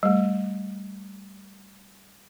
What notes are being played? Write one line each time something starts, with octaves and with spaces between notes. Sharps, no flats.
G3 A3